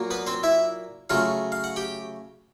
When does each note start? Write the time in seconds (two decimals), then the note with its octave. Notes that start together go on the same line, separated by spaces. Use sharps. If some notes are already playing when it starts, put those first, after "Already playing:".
Already playing: A#2 F#3 A#3
0.11 B3 B4
0.27 C4 C5
0.43 E4 E5
1.10 C#3 F#3 A3 F4 F5
1.52 F5
1.64 F#5
1.76 G4 G5